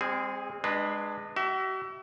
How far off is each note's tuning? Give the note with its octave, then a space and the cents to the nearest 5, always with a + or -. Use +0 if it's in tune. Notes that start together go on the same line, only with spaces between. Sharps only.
G#3 -45 C4 +0 G#4 +0
G#3 +0 D4 +30 B4 +0
F#4 +45 E5 +10